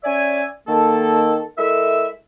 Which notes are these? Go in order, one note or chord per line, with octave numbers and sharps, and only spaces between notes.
C#4 D5 E5 G#5
D#3 A#3 A4
G#3 E4 A4 A#4 E5